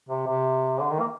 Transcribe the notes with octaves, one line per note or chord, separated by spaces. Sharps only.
C3
C3
D3
D#3
A#3